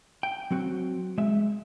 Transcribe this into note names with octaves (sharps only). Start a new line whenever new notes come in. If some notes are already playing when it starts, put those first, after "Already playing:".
G5
F#3 C4 F#4
G#3 E5